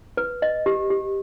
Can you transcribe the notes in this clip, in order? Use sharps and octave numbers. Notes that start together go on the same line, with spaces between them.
B4
D#5
G4
G4